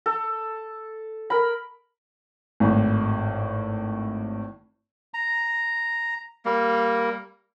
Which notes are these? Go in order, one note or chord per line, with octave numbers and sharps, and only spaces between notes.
A4
A#4 B5
G#1 A2
A#5
G3 A#3